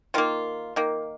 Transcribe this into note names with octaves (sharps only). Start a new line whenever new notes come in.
D#3 A#3 F4
D#3 A#3